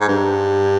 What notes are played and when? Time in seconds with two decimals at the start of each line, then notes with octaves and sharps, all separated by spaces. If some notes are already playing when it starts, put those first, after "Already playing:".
0.01 G#2
0.08 G2